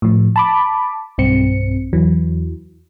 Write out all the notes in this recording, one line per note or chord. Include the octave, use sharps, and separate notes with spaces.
A2 F3
A5 B5 D6
B1 G2 C4 C#7
E2 E3 F#3